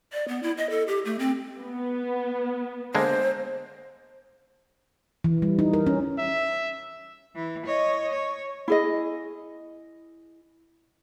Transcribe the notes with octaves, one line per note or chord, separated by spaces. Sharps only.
D5
B3
E4
D#5
A4
G4
A3
C4
B3
D3 G#3 A#3 C5
E3
G3
D#4
A#4
C#4
E5
E3
C#5 D#5
C#5
E4 G#4 D#5